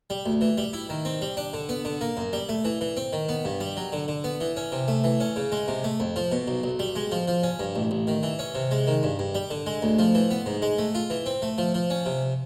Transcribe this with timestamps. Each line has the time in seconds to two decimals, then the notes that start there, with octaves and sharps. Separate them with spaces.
0.10 G3
0.26 D2
0.41 E3
0.58 G3
0.73 E4
0.89 D#3
1.05 C4
1.21 G3
1.37 D4
1.53 D3
1.69 B3
1.85 D3
2.01 A#3
2.17 F#2
2.33 G3
2.49 A3
2.65 E3
2.81 E3
2.97 C4
3.13 D#3
3.29 B3
3.45 G2
3.60 G3
3.77 F#3
3.93 D3
4.08 D3
4.24 B3
4.40 E3
4.57 C#4
4.72 C3
4.88 A3
5.04 E3
5.20 C#4
5.36 C#3
5.52 G#3
5.68 C3
5.84 A3
6.00 F2
6.16 F3
6.32 B2
6.48 B1
6.64 B1
6.79 G3
6.96 G#3
7.12 F3
7.28 F3
7.43 C#4
7.59 G2
7.75 A1
7.91 A1
8.07 D#3
8.23 E3
8.39 C#4
8.55 C3
8.71 G#3
8.87 D#3
9.03 G2
9.19 G2
9.35 G3
9.51 D3
9.66 G#3
9.82 D2
9.99 F3
10.15 E3
10.31 B3
10.46 G#2
10.62 G#3
10.78 A3
10.95 F4
11.10 E3
11.26 C4
11.42 A3
11.58 F3
11.74 F3
11.90 C#4
12.06 C3